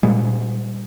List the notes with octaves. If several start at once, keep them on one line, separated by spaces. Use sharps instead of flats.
A#2 G3 G#3